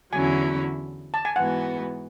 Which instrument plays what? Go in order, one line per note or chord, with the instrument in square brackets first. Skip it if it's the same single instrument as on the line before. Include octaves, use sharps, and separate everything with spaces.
[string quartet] E2 D3 F#3 C#4 E4 [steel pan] G#5
[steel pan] A5
G#5
[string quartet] G#2 E3 B3 F#4 [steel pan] F#5